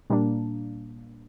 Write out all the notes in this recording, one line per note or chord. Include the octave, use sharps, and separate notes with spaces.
A#2 G3 A#3 D4